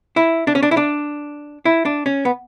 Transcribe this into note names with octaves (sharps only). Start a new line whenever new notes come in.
E4
D4
C#4
D4
E4
D4
E4
D4
C#4
B3